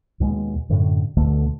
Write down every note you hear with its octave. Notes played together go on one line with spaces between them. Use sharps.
D#2 B2 G#3
F#2 A2 D3
D2 B2 D3 A3